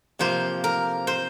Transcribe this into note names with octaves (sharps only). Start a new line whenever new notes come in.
C3 F3 A#3 C5
A#4
C5